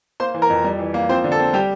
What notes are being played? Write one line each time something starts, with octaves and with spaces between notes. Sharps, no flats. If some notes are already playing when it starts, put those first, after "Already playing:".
A#3 C5 C6
E3
A#4 A#5
F2
G3
E3
A#3
F3 C4 C5
D3
A4
C4
G3 G4